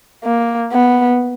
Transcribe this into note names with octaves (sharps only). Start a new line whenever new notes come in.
A#3
B3